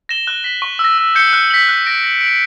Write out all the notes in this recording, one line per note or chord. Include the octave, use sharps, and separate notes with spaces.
A#6 E7 G7
F#6
B6 F#7
C#6
E6
A#6
E6
G6 C#7 G7
F#6
B6 F#7
F#6
A#6 D7
A#6
D7 F#7